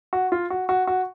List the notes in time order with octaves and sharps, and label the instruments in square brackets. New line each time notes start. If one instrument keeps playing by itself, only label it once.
[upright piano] F#4
F4
F#4
F#4
F#4